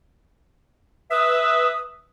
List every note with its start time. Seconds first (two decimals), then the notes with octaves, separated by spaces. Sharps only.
1.11 B4 E5 D#6